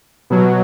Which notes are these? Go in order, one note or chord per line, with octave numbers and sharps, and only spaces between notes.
B2 F#3